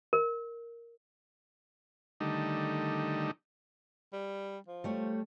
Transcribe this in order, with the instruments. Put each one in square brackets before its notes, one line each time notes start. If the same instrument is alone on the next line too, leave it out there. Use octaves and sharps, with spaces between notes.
[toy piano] A#4
[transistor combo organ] D3 D#3 G3 A3 D#4
[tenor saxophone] G3
F3
[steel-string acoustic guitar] G3 A3 C#5